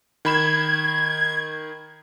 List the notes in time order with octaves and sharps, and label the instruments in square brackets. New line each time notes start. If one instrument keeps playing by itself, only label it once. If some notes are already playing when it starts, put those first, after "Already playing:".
[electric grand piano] D#3 B5 E7 [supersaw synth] G#6